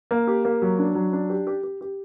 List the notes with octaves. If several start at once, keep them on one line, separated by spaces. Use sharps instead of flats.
A#3
G4
A#3
F#3
D4
F#3
D4
G4
G4
G4
G4